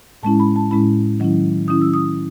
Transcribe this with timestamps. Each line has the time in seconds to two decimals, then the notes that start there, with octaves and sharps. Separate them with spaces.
0.23 A2 G#3 C#4 E4 A5
0.40 B5
0.56 A5
0.71 A2 G#3 C#4 E4 B5
1.20 D#3 F#3 C#4 E4
1.68 D#3 F#3 C#4 E4 D#6
1.82 E6
1.94 D#6